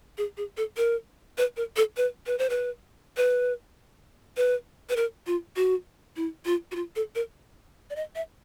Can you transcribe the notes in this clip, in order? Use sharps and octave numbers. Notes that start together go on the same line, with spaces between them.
G#4
G#4
A4
A#4
B4
A#4
A4
B4
B4
C5
B4
B4
B4
B4
A#4
F4
F#4
E4
F4
F#4
F4
A4
A#4
D5
D#5
E5